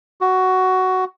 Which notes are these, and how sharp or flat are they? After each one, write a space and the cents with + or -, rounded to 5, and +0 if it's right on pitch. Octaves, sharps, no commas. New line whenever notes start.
F#4 +10